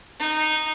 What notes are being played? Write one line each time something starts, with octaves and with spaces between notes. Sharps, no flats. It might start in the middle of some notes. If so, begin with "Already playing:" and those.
D#4